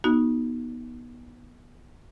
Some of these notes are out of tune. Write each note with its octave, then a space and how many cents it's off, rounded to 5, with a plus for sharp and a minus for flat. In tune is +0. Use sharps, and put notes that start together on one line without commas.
B3 -25 D#4 +0 F#4 +0